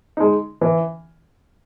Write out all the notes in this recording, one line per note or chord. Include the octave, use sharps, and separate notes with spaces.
G#3 D#4
E3